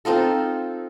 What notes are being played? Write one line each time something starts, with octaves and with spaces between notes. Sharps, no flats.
C4 D#4 F4 A4